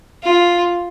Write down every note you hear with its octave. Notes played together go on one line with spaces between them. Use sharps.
F4